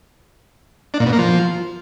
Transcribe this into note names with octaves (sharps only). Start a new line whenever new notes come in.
D4
A#2
B2
A#3
F3